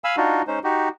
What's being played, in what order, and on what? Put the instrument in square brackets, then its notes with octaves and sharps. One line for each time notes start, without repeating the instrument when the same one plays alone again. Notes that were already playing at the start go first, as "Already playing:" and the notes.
[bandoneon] F5 G#5 B5 E6
D4 D#4 F4 F#4
G#3 C#4 D#4 C5
D#4 F#4 G4